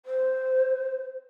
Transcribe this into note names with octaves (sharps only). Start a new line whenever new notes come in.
C5